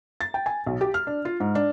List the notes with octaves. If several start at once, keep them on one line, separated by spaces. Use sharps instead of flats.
A6
G5
G#5
B1
G4
F6
D4
F4
G#2
D4